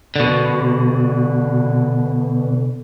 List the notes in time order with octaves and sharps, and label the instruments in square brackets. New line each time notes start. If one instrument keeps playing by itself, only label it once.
[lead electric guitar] B2 D3